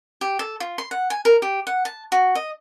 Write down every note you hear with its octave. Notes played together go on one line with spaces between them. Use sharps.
G4
A4
F4
C6
F#5
G#5
A#4
G4
F#5
A5
F#4
D#5